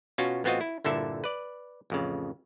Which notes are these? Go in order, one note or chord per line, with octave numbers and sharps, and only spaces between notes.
B2 C#4 F4 F#4
A1 B3 C4 F4 F#4 D#5
E4
G1 A#2 D3 E4 A4 E5
B4 D5
A1 F2 C#3